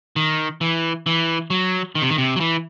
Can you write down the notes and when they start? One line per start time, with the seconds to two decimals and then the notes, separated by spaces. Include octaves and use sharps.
0.16 D#3
0.61 E3
1.06 E3
1.50 F#3
1.95 D#3
2.02 C3
2.10 D#3
2.18 C3
2.36 F#3
2.40 E3